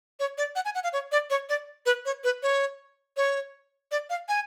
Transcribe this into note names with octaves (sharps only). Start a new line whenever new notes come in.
C#5
D5
F#5
G#5
F#5
F5
C#5
D5
C#5
D5
B4
C#5
B4
C#5
C#5
D5
F5
G#5